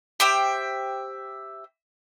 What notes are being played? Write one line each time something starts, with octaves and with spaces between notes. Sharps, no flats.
G4 C5 E5 G5